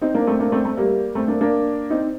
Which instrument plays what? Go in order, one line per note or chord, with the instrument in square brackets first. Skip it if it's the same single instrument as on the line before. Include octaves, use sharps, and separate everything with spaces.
[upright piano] C4 D#4
A#3 D4
A3 C4
A#3 D4
A3 C4
A3
G3 A#3
A3 C4
A#3 D4
A#3 D4
C4 D#4